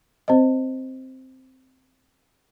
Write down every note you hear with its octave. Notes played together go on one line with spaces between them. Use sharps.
C4 C5 D#5